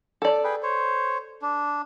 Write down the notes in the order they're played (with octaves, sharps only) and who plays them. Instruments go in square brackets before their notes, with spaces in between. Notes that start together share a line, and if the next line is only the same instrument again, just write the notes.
[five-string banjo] A4 D5
[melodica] G#4 B4 G5
C5 C#5
D4